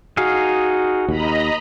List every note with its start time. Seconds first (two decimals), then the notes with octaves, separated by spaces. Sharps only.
0.17 D#4 F#4 G#4 F5
1.08 D#2 D#5 A#5 B5